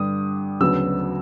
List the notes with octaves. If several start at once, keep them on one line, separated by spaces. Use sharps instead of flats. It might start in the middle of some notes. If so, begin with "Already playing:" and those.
Already playing: G2 D3 G3 D#6
D2 C#3 F#3 B3 E6